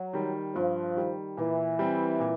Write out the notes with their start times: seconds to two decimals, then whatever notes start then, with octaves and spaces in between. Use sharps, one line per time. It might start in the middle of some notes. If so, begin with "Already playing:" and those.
Already playing: F#3
0.13 D#3 G3
0.55 G2 F3
0.96 D#3 G3
1.37 A#2 E3
1.79 G3 C4
2.20 A#2